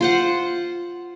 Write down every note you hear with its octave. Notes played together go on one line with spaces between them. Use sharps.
F4 C5 F#5